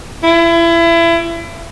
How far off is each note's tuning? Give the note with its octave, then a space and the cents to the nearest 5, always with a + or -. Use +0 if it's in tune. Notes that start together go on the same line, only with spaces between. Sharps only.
E4 +30